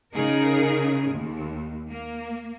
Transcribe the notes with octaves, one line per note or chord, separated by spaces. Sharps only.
C#3 D#4 G#4 A#4
D#2
A#3